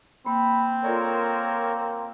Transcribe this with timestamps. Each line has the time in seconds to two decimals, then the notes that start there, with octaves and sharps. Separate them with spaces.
0.26 A#3 C4 G5 B5
0.84 A#3 F4 A4 A#4 C#5 D5